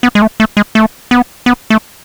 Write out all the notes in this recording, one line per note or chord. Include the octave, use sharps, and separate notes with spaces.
B3
G#3
A3
A3
G#3
A3
B3
B3
A3